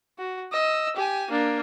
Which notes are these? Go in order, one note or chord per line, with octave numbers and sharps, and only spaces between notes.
F#4
D#5 E6
G4 G#5
A#3 D4